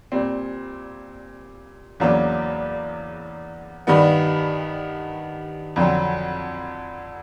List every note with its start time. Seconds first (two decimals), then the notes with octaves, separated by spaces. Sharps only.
0.12 A#2 G3 C4
2.00 E2 C#3 F#3 A#3 D4
3.87 G2 D#3 G3 B3
5.76 F2 D3 F#3